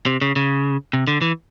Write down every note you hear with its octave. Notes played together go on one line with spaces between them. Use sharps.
C3
C#3
C#3
C3
D3
E3